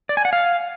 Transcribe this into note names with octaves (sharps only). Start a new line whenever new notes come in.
D5
G#5
F#5
F5